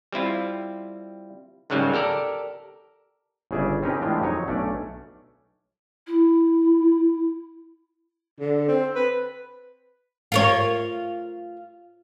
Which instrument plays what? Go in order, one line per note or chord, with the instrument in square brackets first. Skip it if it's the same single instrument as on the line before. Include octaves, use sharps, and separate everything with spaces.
[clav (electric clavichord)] G3 C4 E4 F4
C#2 G#2 C#3 F#3 G3 A#3
G4 A4 A#4 D5
G1 C#3 G#4 D5 E5
C4 C#4 D#4 G4 A#4 B4
A2 E3 G#3 D4 F4 G4
F2 F#3 D#4 C#5
B1 A3 C#4 D4 D5
[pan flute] E4
[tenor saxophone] D3
C4
B4
[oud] F4 A#4 C#5